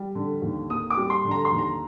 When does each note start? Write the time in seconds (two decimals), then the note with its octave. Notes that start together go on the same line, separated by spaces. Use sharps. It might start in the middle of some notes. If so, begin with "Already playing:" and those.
Already playing: G3
0.15 D3
0.42 D#2
0.70 A#3 D#6
0.90 D6
0.97 G3
1.10 C6
1.25 D3
1.31 A#5
1.45 C6
1.51 D#2
1.58 A#5